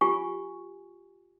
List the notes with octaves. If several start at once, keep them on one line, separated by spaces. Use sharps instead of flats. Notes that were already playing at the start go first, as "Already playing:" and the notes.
F4 G4 G#5 C#6